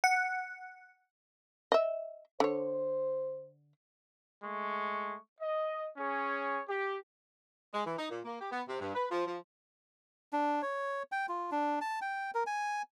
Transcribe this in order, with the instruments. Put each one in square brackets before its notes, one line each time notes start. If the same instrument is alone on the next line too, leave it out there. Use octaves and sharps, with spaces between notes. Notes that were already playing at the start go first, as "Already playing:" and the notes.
[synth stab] F#5
[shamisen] D#5 E5
[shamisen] D3 C#5 [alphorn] C5
[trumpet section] G#3 A3 C#6
D#5
C#4 G#4 C#5
G4
[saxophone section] G#3
E3
D#4
A#2
A#3
G4
B3
C3
G2
B4
F3
F3
[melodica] D4
C#5
G5
F4
D4
A5
G5
A#4
G#5